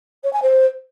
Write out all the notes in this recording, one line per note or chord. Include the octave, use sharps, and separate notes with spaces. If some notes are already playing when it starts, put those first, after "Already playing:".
C#5
G#5
C5